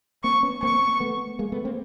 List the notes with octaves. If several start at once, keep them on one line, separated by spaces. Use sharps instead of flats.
A#3 C4 C#6
B3 C#4
A#3 C4 C#6
A3 B3
G#3 A#3
A3 B3
A#3 C4